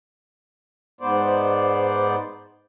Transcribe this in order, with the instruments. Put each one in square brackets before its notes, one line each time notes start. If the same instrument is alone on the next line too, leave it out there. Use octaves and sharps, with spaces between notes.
[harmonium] G#2 B3 C5 D5